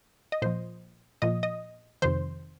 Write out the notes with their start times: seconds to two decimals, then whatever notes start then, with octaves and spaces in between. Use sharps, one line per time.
0.32 D#5
0.42 A#2 F3 C5
1.22 A#2 F3 D#5
1.43 D#5
2.02 F2 C3 D#3 C5